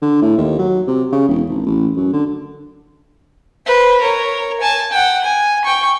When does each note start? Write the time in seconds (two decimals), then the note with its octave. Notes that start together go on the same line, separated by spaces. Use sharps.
0.02 D3
0.22 A2
0.37 D#2
0.58 F#3
0.87 C3
1.12 C#3
1.28 E1
1.49 G#1
1.66 A1
1.96 F#2
2.12 D3
3.66 B4 C5
4.01 A#4 C#5
4.61 G#5 A5
4.91 F#5 G5
5.24 G#5
5.65 G5 C#6